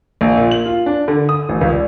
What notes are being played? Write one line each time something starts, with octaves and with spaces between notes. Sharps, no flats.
A#1
A#2
F#7
F4
D4
D3
D#6
A1
C#2
D5